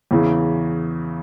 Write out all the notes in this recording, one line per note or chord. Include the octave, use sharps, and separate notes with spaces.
E2 C#3 E3